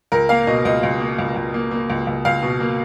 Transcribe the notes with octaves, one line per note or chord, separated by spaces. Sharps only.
C#2 A#4
A#3 F5
B2 D#5
C#2 D#5
C#2
A#3
C#2
C#2
A#3
A#3
C#2
C#2
C#2 F5
B2
A#3